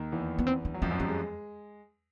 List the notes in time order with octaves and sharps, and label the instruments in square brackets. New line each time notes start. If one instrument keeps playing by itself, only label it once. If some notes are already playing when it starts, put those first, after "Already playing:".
Already playing: [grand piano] D#2 D#3
E2 E3
[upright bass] B3
C4
D4
[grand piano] F#3
[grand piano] F2 F3 [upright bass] C#4
[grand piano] F#2 F#3
[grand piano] G3 [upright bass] C#4
[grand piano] G#3